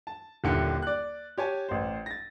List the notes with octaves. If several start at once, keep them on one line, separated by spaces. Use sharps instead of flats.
A5
D#1 D#2 D3 E4 C#7
D5 F#6
G4 C#5 G#5 A5
A1 C5
A6 A#6